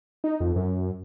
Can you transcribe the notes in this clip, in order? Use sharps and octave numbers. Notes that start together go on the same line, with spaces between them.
D#4
F2
F#2